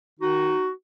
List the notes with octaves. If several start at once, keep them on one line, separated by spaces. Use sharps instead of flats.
D#3 D#4 F#4